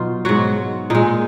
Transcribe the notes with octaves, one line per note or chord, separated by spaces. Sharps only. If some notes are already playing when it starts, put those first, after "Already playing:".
Already playing: B2 F#3 D#4 F4
G#2 F#3 F#4
A#2 G#3 D#4